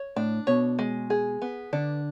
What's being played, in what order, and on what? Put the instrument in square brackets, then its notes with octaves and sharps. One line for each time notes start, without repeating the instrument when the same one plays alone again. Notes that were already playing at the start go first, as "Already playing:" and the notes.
Already playing: [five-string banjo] C#5
[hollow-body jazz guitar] A2 [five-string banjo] D4
[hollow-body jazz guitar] B2 [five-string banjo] C#5
[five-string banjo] G#3
G#4
B3
[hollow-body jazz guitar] D3 [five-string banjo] D4